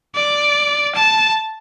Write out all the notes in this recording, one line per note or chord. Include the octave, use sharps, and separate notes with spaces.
D5
A5